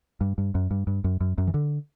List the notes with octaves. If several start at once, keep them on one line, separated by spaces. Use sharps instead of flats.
G2
G2
F#2
G2
G2
F#2
F#2
F#2
E3
D3